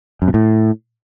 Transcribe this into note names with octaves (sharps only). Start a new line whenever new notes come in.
F#2
B2
A2